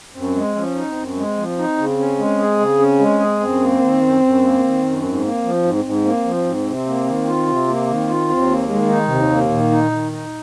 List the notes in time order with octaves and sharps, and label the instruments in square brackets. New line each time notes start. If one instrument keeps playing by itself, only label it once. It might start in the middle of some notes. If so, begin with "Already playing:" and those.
[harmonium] F#2 [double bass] C4
[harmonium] G#3
[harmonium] F3 [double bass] C#4
[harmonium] D#4
[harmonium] F#2 [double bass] C4
[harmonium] G#3
F3
D#4
C#3
C#4
G#3
G#4
C#3
C#4
G#3
G#4
[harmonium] F#2 [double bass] C4
[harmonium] A#3
D#3
F#2
F#2
A#3
D#3
F#2
[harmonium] G#2 [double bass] C4
[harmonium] A#3
F3
G#2
G#2
A#3
F3
G#2
C3
A#3
D#3
F4
C3
A#3
D#3
F4
[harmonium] D#2 [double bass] C4
[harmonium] A#3
[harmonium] D#3 [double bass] G#3
[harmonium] D#4
[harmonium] D#2 [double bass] C3
[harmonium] A#3
[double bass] A#2 [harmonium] D#3
[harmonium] D#4
D#3
D#4